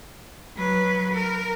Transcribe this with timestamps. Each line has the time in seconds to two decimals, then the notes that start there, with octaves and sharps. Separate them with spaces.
0.57 F#3 B4
1.14 A#4